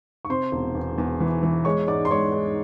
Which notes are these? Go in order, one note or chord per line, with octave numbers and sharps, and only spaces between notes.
C#6
C3 C5 C6
E1
E2
E2
E3
E3
G#3 C#5 C#6
G#2 D5 D6
C6
G#3 C#5 C#6
G#3